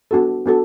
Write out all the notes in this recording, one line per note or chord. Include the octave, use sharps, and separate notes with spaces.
B3 D4 F#4 A4
B3 D4 F#4 A4